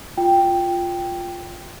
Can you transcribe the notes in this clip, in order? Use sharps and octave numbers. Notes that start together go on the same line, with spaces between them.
F4 G5